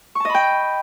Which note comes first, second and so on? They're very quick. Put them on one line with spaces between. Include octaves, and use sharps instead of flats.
C#6 A5 D#5 B5 G5